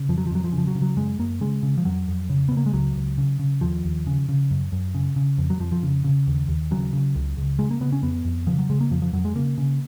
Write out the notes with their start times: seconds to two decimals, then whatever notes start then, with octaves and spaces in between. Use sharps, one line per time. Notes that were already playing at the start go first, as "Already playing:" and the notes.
Already playing: C#3
0.09 F2 F3
0.18 F#3
0.27 F3
0.31 F2 F#3
0.44 F3
0.53 C#3
0.58 F3
0.67 F#3
0.75 C#3
0.82 F#3
0.97 F#2 G#3
1.19 F#2 A#3
1.41 C#3 G#3
1.63 C#3
1.78 F3
1.85 F2 F#3
2.08 F2
2.29 C#3
2.49 C#3 B3
2.57 A#3
2.66 G#3
2.73 C#2 F#3
2.96 C#2
3.18 C#3
3.39 C#3
3.61 D#2 F3
3.85 D#2
4.07 C#3
4.29 C#3
4.51 F#2
4.72 F#2
4.95 C#3
5.16 C#3
5.38 F2
5.50 F#3
5.60 F2 F3
5.72 F3
5.83 C#3
6.04 C#3
6.27 D#2
6.48 D#2
6.71 C#3 F#3
6.93 C#3
7.16 C#2
7.37 C#2
7.59 C#3 G#3
7.71 A#3
7.81 C#3 B3
7.92 C#4
8.03 F2 B3
8.25 F2
8.47 C#3 F3
8.59 F#3
8.70 C#3 G#3
8.81 A#3
8.91 F2 F3
9.02 F3
9.13 F2 F#3
9.25 G#3
9.36 C#3 A#3
9.58 C#3